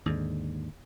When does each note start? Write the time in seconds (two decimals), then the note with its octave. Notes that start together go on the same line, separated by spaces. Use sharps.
0.06 D#2 G#2 D3